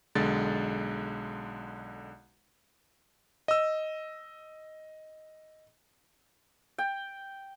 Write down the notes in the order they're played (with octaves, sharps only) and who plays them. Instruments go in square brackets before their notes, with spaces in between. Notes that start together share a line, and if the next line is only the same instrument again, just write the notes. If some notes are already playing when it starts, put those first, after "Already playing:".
[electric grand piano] B1 D3 G#3 A6
D#5 E6
[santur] G5